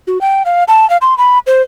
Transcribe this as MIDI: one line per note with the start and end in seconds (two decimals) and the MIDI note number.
0.07 0.20 66
0.21 0.43 79
0.45 0.64 77
0.68 0.88 81
0.90 0.97 77
1.02 1.17 84
1.18 1.39 83
1.47 1.62 72